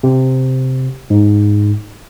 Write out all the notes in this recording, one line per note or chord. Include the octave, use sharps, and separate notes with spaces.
C3
G#2